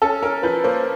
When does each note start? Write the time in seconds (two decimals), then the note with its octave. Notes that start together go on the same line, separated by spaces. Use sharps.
0.02 C#4 A4
0.22 C#4 A#4
0.43 F3 B4
0.64 A#3 C5